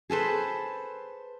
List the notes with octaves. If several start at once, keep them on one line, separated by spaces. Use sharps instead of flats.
G#4 A4 B4 C5